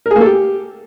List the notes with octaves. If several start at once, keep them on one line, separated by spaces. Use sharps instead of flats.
A#4
G#4
A#3
A4
G4